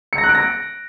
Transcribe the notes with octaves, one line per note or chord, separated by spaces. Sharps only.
C#7
A#6
F#6
D7
A#6